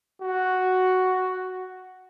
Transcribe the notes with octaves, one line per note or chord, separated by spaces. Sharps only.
F#4